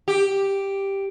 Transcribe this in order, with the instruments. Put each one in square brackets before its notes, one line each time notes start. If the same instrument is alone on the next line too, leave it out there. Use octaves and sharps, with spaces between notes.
[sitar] G4